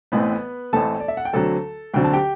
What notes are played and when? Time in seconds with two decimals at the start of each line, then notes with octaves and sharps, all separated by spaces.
0.12 A1 A2 E3 A3 B3 C4 B4
0.73 A1 A2 E3 A3 C4 A4 A5
1.00 D5
1.08 E5
1.17 F#5
1.25 G5
1.33 D2 D3 F#3 C4 A4 A5
1.94 D2 D3 F#3 C4 G5
2.04 A5
2.13 G4 G5